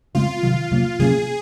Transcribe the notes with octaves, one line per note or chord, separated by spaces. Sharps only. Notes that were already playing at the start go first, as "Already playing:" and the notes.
C#3 G#3 C4 F4
C3 D#3 F#3 F4
C3 F#3 A#3
C3 F#3 A#3 C#4 G#4